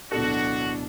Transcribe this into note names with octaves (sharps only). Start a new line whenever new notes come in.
D1 B2 D4 F#4 A4